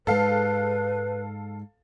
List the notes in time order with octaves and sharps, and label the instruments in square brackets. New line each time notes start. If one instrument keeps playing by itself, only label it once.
[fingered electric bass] G#2 G#3 [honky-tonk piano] A4 F5 [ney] B4